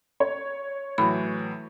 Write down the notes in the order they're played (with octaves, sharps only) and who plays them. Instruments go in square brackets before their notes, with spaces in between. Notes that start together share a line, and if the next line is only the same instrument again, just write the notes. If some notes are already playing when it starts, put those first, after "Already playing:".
[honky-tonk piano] C#5
[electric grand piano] A2 E3 F#3 [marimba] B5